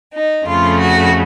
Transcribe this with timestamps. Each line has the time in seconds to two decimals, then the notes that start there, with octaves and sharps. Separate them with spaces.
0.14 D#4
0.47 F2 C#3 A3 F4
0.80 F#4